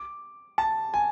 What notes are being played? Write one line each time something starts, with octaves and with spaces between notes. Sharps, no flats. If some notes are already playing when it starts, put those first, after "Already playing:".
Already playing: D6
A5
G#5